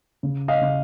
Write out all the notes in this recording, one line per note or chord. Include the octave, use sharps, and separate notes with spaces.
C#3
D#5 F5
C#3